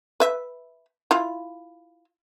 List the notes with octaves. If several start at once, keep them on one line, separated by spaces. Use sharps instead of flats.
B4 E5
E4 F4